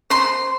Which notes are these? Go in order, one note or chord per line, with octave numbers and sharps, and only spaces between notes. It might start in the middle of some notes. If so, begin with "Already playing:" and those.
C5 C6